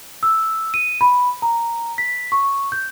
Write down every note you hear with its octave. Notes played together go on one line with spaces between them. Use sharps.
E6
D#7
B5
A#5
B6
C#6
G6